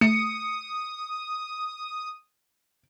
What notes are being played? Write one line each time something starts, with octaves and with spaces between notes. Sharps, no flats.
A3 D#6 C#7